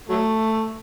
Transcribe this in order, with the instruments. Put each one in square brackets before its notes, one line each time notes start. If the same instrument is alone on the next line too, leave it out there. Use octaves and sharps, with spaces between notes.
[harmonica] F#3 A3